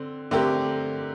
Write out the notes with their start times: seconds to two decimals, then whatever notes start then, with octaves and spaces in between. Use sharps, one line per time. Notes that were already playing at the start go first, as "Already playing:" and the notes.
Already playing: D3 C4
0.31 D3 A3 C4 G4 A#4